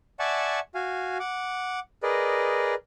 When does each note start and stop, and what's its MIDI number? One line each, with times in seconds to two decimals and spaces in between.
0.20 0.60 74
0.20 0.60 76
0.20 0.60 78
0.20 0.60 80
0.20 0.60 81
0.20 0.60 85
0.75 1.18 66
0.75 1.18 77
0.75 1.18 80
1.20 1.80 78
1.20 1.80 86
2.03 2.75 68
2.03 2.75 70
2.03 2.75 71
2.03 2.75 74
2.03 2.75 75